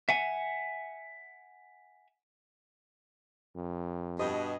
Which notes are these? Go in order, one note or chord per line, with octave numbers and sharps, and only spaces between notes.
E5 F#5 G#5
F2
G2 B2 D#5